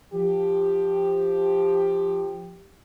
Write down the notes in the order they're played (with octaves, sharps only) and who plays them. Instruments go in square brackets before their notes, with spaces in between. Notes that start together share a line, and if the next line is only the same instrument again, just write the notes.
[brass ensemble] F3 G4